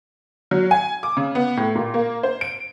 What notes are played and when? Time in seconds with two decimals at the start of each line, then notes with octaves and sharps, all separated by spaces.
0.51 F#3
0.71 G#5
1.03 D6
1.17 C#3
1.35 B3
1.57 A2
1.75 A#2
1.94 A#3
2.23 C5
2.41 D7